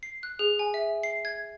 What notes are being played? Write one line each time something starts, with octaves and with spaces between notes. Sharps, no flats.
C7
F#6
G#4
G#5
E5
C7
G#6